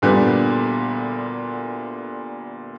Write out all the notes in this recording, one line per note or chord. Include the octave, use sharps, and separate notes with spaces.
D2 A#2 D3 G3 B3